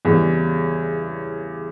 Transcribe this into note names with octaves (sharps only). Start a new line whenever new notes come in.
E2 C#3 G3